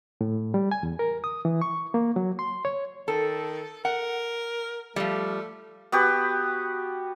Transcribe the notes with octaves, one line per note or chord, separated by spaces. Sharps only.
A2
G3
G#5
E2
A#4
D#6
E3
C#6
A#3
F#3
C6
C#5
D#3 A4
A#4 F#5
F3 G3 A3
B3 F#4 G4 B4